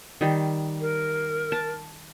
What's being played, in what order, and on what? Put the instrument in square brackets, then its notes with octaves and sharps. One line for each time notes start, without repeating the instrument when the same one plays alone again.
[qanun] D#3 G3
[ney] A#4
[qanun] A5